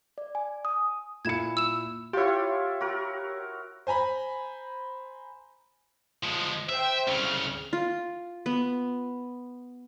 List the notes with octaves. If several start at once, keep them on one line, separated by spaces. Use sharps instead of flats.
D5
G#5
D#6
A#2 E4 G#6 C#7 E7
E6 E7
E4 F4 G4 C#5
F#4 A#4
C5 G#5 A#5 B5
F3 G#3
C5 E5 G5
C2 C#3 F6
F4
B3